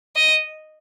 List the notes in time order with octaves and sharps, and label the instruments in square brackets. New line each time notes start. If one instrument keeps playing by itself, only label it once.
[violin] D#5